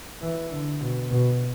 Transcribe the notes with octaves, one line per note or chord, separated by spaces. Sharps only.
E3
D3
B2
B2